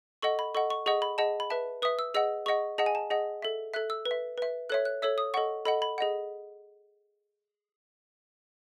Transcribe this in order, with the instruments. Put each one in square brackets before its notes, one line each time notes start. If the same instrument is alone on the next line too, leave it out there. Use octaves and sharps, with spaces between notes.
[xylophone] A4 D#5 F#5 C#6
B5
A4 D#5 F#5 C#6
C#6
G#4 D#5 F#5 C#6
B5
G#4 D#5 F#5 A5
B5
B4 E5 A5
B4 E5 D#6
E6
G#4 D#5 F#5 E6
G#4 D#5 F#5 C#6
G#4 D#5 F#5 A5
G#5
A5
G#4 D#5 F#5
A4 E5
A4 E5 F#6
E6
B4
E5
B4 E5
A4 C#5 E5 F#6
F#6
A4 C#5 E5 E6
D#6
A4 D#5 F#5 C#6
A4 D#5 F#5 B5
B5
G#4 D#5 F#5